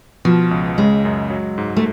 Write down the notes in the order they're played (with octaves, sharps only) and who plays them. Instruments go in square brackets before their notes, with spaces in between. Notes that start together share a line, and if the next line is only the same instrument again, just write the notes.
[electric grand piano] B2 [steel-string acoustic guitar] F3
[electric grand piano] C#2
[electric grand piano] C#3 [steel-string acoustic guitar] G#3
[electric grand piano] F#2
F#3
G#2
[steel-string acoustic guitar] A3